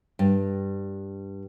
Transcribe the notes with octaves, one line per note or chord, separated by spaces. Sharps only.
G2